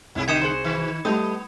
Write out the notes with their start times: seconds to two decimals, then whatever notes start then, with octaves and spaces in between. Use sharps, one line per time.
0.15 C2 G#2 E4 G#4
0.28 D3 G4 D#5 D#6 G#6 C#7 E7
0.42 F#4 G#4 C5
0.64 D#3
1.05 G3 A3 B3 D#5 D#6